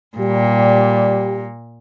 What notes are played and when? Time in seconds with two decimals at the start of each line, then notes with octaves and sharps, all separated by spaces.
0.17 A#2 G3